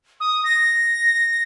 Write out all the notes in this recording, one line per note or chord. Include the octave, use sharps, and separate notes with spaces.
D#6
A#6